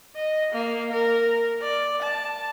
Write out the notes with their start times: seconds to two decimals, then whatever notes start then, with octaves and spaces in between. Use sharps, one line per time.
0.16 D#5
0.52 A#3
0.92 A#4
1.62 D5
2.02 A5